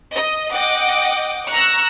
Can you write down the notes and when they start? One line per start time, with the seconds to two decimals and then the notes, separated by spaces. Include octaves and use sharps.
0.13 D#5
0.52 D#5 F#5 G5 D6
1.50 A#5 C#6 E6 F#6 A#6